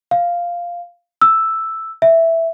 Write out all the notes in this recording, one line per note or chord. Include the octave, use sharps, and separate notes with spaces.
F5
E6
E5